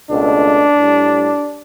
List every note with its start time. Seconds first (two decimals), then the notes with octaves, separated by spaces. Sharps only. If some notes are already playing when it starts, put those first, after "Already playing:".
0.10 C#2 B2 A3 D4
0.77 A2 G3